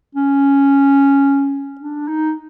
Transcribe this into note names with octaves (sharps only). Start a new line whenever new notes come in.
C#4
D4
D#4